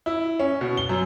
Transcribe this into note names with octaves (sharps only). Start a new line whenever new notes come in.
E4
C#4
B2
G7
F#2